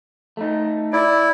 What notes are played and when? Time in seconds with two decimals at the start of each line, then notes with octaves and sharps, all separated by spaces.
0.37 A3 D#4
0.93 E4 D5